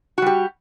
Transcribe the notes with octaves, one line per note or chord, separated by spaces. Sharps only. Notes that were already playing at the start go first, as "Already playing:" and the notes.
G3 F#4 G4